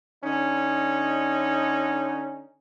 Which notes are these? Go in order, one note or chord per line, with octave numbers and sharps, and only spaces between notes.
D3 C#4 D#4